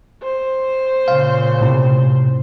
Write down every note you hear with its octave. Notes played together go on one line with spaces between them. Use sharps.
C5
A#2 C#3 F5
A2 C3